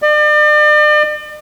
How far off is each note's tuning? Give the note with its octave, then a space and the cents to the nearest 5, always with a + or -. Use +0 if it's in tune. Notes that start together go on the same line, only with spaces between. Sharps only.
D5 +40